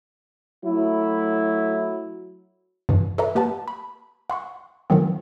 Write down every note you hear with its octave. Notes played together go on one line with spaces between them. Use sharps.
F#3 A3 E4
G2 B2 E3
A4 B4 D5 E5 A#5
A#3 G4 B4 F#5 A5
B5
F#5 C6 C#6
D#3 F3 F#3 B3 C4